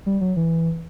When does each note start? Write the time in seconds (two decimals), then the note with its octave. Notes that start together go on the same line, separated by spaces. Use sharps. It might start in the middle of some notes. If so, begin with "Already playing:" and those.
0.06 G3
0.21 F#3
0.37 E3